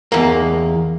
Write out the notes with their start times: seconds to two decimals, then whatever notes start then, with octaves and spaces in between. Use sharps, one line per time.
0.12 E2 A#3